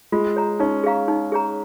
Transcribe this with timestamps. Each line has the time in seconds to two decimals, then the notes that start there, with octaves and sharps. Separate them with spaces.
0.12 G#3 F4
0.36 C#5 A#5
0.60 C#4 D#4
0.84 G#4 F5 A#5
1.08 D#4
1.32 G#4 C#5 A#5